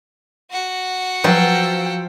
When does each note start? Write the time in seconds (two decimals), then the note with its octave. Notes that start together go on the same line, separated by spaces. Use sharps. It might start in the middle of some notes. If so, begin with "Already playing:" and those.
0.51 F#4 F#5
1.24 F3 F#3 B4 G5 E6